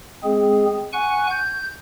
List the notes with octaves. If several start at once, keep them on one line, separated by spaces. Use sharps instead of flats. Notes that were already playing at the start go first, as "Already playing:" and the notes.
G#3 C4 G#4
F#5 G#5 C#6 F#6
G6